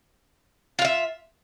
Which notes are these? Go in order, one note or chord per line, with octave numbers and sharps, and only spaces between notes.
F4 E5 F5